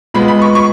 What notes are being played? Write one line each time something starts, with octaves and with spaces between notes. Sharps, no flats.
A#2 G#3 B3 B5
B5
C#6
C#6